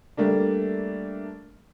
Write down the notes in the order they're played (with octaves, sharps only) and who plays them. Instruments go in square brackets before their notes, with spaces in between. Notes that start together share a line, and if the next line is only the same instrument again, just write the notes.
[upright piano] G3 A3 A#3 D4